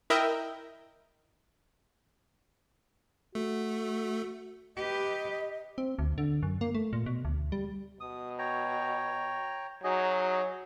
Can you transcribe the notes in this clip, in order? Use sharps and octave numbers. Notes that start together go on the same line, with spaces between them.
E4 A#4 D#5 E5 G5
A3 F#4
G4 B4 D#5
C4
D2
D3
F#2
A#3
A3
A#2
B2
D2
G3
B2 D#6
C#5 G5 A#5
F#3 D#4 G#4 D#5